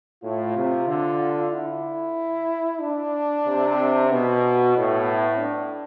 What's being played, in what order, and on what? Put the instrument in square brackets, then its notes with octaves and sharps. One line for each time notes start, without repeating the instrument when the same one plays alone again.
[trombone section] A2 [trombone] F4
[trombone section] C3
D3
[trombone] E4
D4
[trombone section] C3
[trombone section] B2 [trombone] B3
[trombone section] A2
[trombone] D4